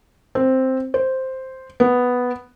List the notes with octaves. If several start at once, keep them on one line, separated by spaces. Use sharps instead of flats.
C4
C5
B3